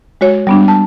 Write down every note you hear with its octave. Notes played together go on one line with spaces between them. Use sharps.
G#3 F#4 C#5
G3 B3 D4
A5